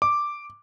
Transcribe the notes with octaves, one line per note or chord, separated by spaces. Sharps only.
D6